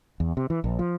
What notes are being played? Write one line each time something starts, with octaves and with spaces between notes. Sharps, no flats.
E2
C3
E3
A#1
F3